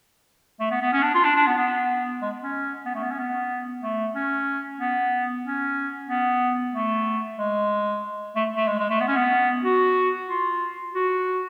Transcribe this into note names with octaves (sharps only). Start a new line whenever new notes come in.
A3
B3
B3
C#4
D4
F4
D4
D4
B3
B3
G#3
C#4
B3
A3
B3
C#4
B3
A3
C#4
B3
C#4
B3
A3
G#3
A3
A3
G#3
G#3
A3
B3
C#4
B3
F#4
F4
F#4